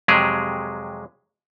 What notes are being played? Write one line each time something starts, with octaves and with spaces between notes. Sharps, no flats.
F2 C3 F#3 G#3 G4 G#4